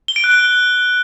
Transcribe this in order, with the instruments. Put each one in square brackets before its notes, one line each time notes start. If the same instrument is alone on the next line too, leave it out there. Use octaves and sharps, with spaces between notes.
[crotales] G7
D7
F#6
G7